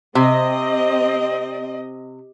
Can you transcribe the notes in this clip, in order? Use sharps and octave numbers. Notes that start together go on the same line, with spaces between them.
C3 C4 D#5